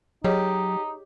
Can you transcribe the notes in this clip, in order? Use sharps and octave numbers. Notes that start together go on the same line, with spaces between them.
F#3 D#4 G4 G#4 C#5 D#5